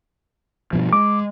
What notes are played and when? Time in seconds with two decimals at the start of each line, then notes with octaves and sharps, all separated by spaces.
0.73 G2 B2 F3
0.93 G#3 D6